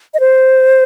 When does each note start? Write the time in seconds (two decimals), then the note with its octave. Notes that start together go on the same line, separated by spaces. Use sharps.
0.14 D#5
0.20 C5